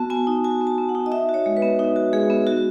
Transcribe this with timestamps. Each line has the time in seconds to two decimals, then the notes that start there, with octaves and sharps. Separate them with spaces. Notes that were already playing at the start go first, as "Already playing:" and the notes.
Already playing: B3 F#4 A5
0.10 B3 G#5
0.27 D#4
0.44 F#4 G#5
0.61 B3
0.67 A5
0.78 B3
0.89 F#5
0.95 D#4
1.06 D#5
1.12 D#4 E5
1.29 F#4
1.34 C#5
1.46 G#3
1.57 B4
1.62 B3
1.79 D#4
1.96 F#4
2.13 G#3 G#4
2.30 B3
2.47 F#4